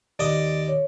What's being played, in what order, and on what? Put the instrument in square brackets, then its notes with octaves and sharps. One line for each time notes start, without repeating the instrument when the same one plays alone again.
[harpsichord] D#2 D#5 [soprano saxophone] D5
[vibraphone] C#5